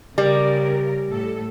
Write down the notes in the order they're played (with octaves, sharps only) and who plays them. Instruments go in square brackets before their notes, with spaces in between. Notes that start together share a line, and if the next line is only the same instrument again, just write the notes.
[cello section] C#3 A#4 [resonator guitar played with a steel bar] G3
[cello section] A2 A4